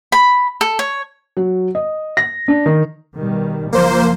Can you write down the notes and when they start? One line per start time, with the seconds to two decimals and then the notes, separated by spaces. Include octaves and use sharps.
0.12 B5
0.61 A4
0.79 C#5
1.37 F#3
1.75 D#5
2.17 A#6
2.48 D4
2.66 D#3
3.17 B2 D#3 G3
3.72 F#1 F3 A#3 C5